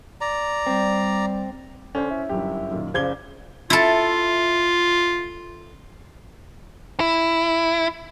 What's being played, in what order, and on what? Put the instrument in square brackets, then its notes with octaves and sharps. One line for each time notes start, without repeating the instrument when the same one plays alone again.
[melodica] D5 A#5
[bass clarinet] G3 [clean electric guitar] C4
[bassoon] D3 [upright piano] C#4 C5
[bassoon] E4
[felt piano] G1 F#2 [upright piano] G4
[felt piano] F#2 A#2 D#3
[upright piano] F#1 G#6 G7 [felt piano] C#3 D5 D6 [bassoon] F3
[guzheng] E4 A4 [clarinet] F4
[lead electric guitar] E4